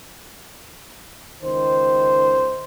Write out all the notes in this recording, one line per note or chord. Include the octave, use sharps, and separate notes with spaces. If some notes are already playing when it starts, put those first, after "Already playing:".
C#2 D#3 C5